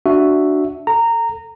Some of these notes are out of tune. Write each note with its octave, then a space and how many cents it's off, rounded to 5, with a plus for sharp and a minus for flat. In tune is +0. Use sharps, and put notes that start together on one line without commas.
D4 +0 F#4 +0 E5 +0
A4 +0 A#5 -15